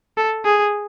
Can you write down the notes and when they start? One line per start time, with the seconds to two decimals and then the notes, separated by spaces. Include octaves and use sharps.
0.17 A4
0.45 G#4